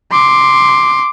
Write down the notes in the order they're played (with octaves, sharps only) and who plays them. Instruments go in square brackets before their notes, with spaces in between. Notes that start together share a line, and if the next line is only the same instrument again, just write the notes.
[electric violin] C6 D6